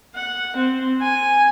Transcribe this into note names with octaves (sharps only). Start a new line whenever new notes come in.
F#5
C4
G#5